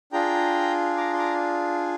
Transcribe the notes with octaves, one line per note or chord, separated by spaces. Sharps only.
D4 F4 G#4 G5 A#5
A#5 D6
C6
A#5 D6